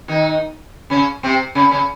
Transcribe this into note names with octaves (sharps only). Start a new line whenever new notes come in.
D#3 D#4
C#3 C#4
C3 C4
C#3 C#4
C#3 C#4